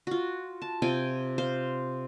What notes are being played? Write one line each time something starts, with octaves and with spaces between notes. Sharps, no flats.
F4 F#4
A5
C3 F4 G5 G#5
C5 F5